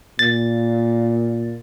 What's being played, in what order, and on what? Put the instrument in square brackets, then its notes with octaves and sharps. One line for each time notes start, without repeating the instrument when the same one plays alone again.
[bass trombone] A#2 [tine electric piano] A6